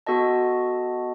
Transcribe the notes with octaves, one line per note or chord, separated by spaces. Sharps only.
B3 F#4 A4 D#5 A5